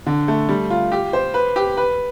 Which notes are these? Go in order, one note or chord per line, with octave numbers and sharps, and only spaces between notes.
D3
A3
G3
F4
G4
C5
B4
G4
B4